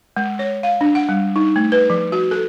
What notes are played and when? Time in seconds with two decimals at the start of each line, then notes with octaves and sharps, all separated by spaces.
0.17 G#3
0.39 C#5
0.63 F5
0.81 D4
0.95 F#5
1.09 G3
1.36 D#4
1.56 A3
1.72 B4
1.90 F3
2.12 F#4
2.31 A4